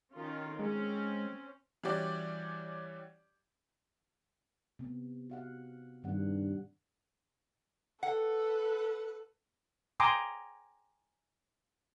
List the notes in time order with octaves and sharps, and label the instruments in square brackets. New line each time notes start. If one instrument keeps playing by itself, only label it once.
[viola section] D#3 C#4 F4
[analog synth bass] G#3 [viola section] C4 C#4
[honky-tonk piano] E3 G3 C#4 F#4 G4 D5
[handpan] C3 B3
F#4 F5 F#5
[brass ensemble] G2 [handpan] D#3 C4 F#5
[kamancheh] A4 B4 [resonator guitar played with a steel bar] F#5
[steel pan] G5 G#5 A#5 C6 D6 D#6